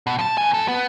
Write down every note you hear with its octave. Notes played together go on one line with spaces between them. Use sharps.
B2
F3 A5
B2 G#5
F2 A4
B3